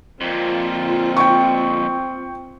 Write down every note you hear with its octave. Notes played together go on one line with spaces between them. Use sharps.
F2 A#2 C4 F4
G5 C#6